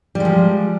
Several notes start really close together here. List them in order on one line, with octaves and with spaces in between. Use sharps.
G3 G#3 F3